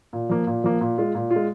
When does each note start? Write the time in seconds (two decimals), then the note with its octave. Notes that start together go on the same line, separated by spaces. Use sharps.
0.13 A#2
0.30 F3 A#3
0.47 A#2
0.64 F3 A#3
0.81 A#2
0.98 G#3 F4
1.15 A#2
1.31 F4
1.36 G#3